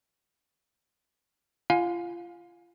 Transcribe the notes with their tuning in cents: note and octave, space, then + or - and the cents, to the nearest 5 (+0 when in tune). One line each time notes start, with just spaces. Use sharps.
F4 -30 F5 +25 G#5 +0